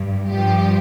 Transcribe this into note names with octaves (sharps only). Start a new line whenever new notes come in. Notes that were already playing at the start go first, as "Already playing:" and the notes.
Already playing: G2
G2 F3 G4